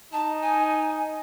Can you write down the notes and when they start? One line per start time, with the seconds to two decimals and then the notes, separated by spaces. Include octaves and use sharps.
0.13 D#4 A5
0.42 G#5